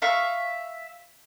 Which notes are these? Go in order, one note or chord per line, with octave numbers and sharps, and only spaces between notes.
E5 F5 C#6